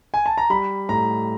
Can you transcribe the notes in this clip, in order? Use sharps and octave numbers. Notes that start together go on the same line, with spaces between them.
G#5
A5
A#5
G3 B5
A2 A#5